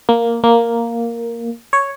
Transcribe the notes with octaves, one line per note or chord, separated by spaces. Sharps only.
A#3
A#3
C#5